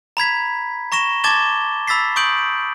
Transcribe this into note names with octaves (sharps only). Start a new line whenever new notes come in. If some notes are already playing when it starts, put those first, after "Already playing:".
A#5 B5 G#6 B6
A#5 C#6 A#6 E7 G7
A5 D6 G#6 A6 E7 G7
B5 E6 A6 B6 C7
C#6 D#6 G6 D7 F#7